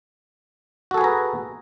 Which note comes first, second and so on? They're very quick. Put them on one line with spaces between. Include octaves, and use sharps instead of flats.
F#4 A4 G#4 B4 A#5